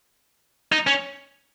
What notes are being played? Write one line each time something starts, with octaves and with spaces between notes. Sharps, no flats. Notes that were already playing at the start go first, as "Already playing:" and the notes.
D#4
C#4